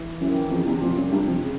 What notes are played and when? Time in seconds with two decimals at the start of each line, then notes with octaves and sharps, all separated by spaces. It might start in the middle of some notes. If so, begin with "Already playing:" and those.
Already playing: E3
0.21 F#2 E3
0.31 D#3
0.51 F2 C#3
0.66 E2 C3
0.81 F2 A#2
0.96 F#2
1.11 G2 C3
1.26 F2
1.42 C#3